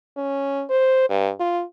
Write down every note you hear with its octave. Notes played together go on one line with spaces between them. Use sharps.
C#4
C5
G2
F4